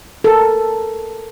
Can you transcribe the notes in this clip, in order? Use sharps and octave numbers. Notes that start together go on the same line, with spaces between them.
A4 A#4